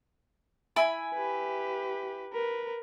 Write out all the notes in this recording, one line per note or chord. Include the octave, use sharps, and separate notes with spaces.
E4 G#5 B5
G4 B4
A#4 B4